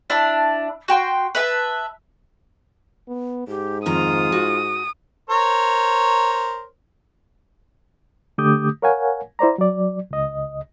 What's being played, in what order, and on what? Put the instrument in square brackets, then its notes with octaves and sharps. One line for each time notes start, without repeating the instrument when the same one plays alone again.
[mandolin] D4 E4 A5
F#4 G5 C6
B4 E5 A5
[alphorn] B3
[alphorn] G#2 [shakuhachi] G4
[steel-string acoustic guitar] F2 D#3 A#5 [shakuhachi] F4 [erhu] D#6
[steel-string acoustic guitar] F#4
[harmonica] A#4 C5 C#5
[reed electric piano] D3 A3 G4 D6 D#6 G6
A#4 C#5 F5 F#5 G#5
E4 C5 D5 A#5
F#3 D5
C#2 D#5